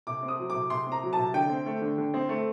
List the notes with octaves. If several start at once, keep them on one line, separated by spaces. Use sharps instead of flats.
C3 D6
C4
D#6
F#3
D6
C3
C3 C6
C4
A#5
F#3
A5
C3
D3 G5
C4
A3
D3
D3
C4
A3